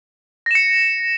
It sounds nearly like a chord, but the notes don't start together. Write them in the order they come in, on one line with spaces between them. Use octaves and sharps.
A#6 E7 C#7